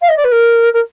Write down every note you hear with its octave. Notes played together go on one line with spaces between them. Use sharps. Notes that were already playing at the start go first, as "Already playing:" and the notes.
F5
D#5
D5
B4
A#4
A#4